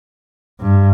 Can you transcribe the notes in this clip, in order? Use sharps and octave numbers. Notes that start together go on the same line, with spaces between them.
G2